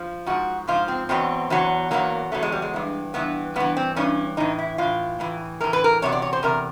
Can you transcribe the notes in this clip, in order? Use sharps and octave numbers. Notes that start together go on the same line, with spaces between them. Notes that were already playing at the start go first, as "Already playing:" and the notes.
Already playing: F3
G#2 F3 F#4
G#2 F3 F4
C4
E2 B2 F#3 C4
E2 B2 F#3
E2 B2 F#3 A#3
E2 B2 F#3 A3
G#3
G3
G#3
G2 E3
G2 E3 B3
G2 E3 B3
C4
G2 E3 C#4
A2 E3 D#4
E4
A2 E3 F4
A2 E3
A2 E3 A#4
B4
A#4
E2 C3 F#3 C#5
D5
C#5
C5
E2 C3 A#4